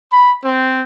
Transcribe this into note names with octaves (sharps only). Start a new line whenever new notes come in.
B5
C4